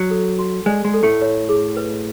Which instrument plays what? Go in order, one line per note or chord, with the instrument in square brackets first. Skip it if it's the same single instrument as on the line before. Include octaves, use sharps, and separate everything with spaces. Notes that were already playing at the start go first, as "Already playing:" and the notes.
Already playing: [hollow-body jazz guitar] F#3
[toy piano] A4
F#4
[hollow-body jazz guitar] G#3 [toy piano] D5
[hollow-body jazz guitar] G#3
[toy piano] A4
[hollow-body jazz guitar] A2 A3
[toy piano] C#5
G#4
B4